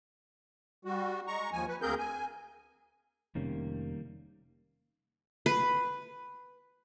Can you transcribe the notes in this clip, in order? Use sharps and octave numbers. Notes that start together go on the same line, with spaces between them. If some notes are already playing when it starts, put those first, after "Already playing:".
G3 F#4
G#3 A#5 C#6
D#2 F3 G#5
B4
D2 A#3 C4 G#4 A#4 G6
G#5
F1 C3 D#3 G3 A#3 C#4
B4